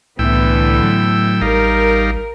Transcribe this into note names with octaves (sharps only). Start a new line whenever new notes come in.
C2 A2 D3 E3 B3 G5 E6
F#3
A1 G3 D#4 A#4 F5